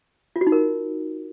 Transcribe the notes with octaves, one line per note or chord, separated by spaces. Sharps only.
F4
F#4
D#4
A#4